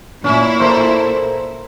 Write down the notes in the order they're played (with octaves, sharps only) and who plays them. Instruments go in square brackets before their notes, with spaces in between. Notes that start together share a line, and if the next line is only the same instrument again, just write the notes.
[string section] A#2 E4 [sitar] C#4
[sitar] A4 A#4 C5